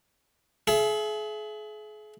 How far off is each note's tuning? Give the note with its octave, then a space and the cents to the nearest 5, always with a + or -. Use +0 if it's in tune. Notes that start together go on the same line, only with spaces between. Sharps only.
G#4 +40 E5 +30